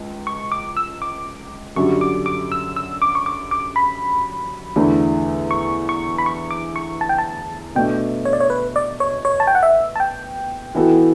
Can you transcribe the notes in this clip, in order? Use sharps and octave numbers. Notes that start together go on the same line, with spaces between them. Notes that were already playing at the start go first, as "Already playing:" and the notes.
Already playing: C#2
C#6
D6
E6
D6
F#2 D3 G3 D4 F#4 C#6
D6
D6
E6
E6
D6
C#6
D6
D6
B5
E2 D3 A3 D4
C#6
C#6
B5
C#6
D6
C#6
A5
G5
A5
B2 A3 D4 G5
C#5
D5
C#5
B4
D5
C#5
C#5
A5
G5
F#5
E5
A5
G5
E3 B3 F#4 A4